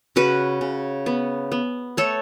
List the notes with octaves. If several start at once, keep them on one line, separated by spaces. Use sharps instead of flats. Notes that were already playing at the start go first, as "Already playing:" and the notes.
C#3 F#4 B4
C#3
B3
B3
A3 A4 C#5